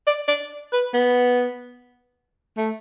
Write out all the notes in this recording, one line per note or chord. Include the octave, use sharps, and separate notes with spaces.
D5
D5
B4
B3
A3